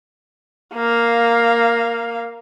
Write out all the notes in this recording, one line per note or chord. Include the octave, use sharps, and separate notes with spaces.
A#3 F5